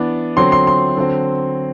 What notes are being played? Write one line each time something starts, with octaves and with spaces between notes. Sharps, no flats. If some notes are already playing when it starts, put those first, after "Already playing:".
Already playing: E3 B3 D4
D3 F#3 C4 C6
C6
C6
D3 F#3 C4